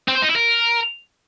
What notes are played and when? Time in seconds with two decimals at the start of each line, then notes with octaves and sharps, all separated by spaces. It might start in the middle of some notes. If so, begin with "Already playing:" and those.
0.08 C4
0.15 C5
0.22 D#4
0.29 E4
0.36 A#4